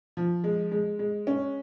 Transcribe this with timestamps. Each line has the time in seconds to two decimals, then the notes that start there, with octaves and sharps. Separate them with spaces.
0.17 F3
0.44 G#3
0.72 G#3
0.99 G#3
1.27 C#4